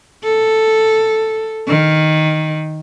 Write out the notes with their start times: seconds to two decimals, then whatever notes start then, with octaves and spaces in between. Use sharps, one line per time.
0.24 A4
1.68 D#3